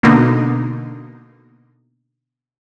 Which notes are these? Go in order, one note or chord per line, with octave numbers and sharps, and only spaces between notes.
B2 D3 A#3 D#4